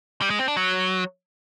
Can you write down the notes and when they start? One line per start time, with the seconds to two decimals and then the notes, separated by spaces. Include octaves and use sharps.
0.21 G3
0.30 G#3
0.39 C4
0.48 D4
0.57 F#3